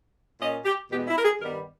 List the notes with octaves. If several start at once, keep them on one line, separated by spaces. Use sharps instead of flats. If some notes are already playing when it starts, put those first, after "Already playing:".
A#2 A#3 C#4 D#5
G4
E2 B2 G#3 B3 G4
E4
A#4
G#4
G2 D#3 G3 B3 A#4